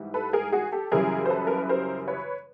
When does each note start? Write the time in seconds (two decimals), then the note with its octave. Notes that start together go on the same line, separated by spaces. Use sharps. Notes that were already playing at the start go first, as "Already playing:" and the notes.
Already playing: G#2 E3 G3
0.14 A4 B4
0.33 G#4 A#4
0.52 F#4 G#4
0.72 G4 A4
0.92 F#2 C#3 E3 G3 G#4 A#4
1.26 C5
1.30 A4 B4
1.47 A#4
1.58 B4
1.69 A#4 C5
2.08 B4 C#5